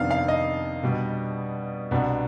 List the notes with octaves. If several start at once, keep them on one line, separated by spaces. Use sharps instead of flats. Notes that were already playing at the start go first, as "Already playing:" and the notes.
Already playing: F2 C3 D#3 B3 D4 F5
F5
D#5
B2 G3 D4
C2 B2 B3 D4